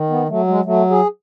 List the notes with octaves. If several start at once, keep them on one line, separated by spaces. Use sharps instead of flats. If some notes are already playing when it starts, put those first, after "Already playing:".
Already playing: D#3
B3
F#3 A3
G#3
F#3 A3
G#4